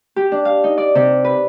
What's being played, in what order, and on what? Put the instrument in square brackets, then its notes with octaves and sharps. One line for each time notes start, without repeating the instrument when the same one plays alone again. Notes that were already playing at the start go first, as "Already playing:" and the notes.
[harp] G4
D4
F5
D#4
D5
C3
B4